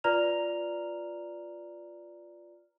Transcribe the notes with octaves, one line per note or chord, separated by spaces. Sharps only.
F4 B4 D5 A#5 F6 F7